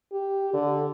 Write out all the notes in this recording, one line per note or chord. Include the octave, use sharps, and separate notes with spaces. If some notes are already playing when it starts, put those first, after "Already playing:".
G4
D3